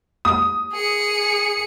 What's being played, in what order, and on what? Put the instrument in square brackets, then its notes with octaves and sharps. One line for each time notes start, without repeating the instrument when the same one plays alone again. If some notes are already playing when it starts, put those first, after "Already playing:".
[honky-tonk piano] D#6
[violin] G#4 C#7